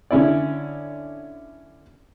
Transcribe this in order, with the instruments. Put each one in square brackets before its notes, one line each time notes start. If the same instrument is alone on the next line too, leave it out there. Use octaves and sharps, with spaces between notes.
[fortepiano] D3 C#4 E4 D5